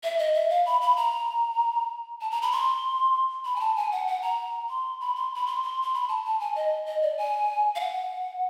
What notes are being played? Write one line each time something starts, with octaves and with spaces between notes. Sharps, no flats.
E5
D#5
E5
F5
B5
B5
A#5
A5
A#5
B5
C6
B5
G#5
A5
G#5
F#5
F#5
A#5
C6
B5
C6
B5
C6
C6
C6
B5
A5
A5
G#5
D#5
D#5
D5
G#5
F5
F#5